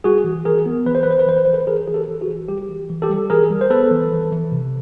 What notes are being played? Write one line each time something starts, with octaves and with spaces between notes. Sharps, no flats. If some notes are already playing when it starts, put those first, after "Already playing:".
G3 F#4 G#4
E3
E3 G#4 A#4
B3
E3 B4
C5
E3 B4
C5
B4
E3 C5
B4
E3 C5
A4 B4
E3 G#4 A#4
E3 G#4
G4 A4
E3
F#4 G#4
E3
G3 G4
E3
E3
G4 A4
G3
E3 G#4 A#4
G3
C5
B3 A4 B4
E3
E3
E3
C3